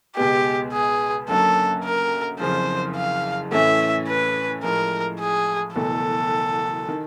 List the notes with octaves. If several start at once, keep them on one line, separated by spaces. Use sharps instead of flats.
C#2 B2 G#3 B3 G4
G#4
F#2 D3 F#3 A#3 C#4 A4
A#4
F#1 F2 C#3 F3 C5
F5
A2 E3 A3 C#4 E5
B4
A2 F3 G#3 A#4
G#4
F#1 E2 B2 F#3 A3 A4
D#3